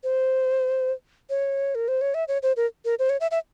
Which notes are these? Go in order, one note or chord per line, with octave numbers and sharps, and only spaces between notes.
C5
C#5
A#4
C5
C#5
E5
C#5
C5
A#4
A#4
C5
C#5
E5
E5